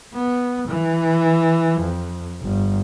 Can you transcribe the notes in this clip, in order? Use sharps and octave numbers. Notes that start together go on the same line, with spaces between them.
B3
E3
F2
G1